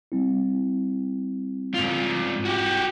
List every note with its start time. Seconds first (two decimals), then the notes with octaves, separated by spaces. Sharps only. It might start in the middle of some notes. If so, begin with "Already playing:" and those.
0.12 G3 C4 E4
1.74 G#2 F4
2.45 F#4 G4